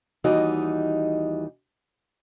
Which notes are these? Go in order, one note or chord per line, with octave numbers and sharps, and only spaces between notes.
D#2 E3 G3 D#4 F#4 D#5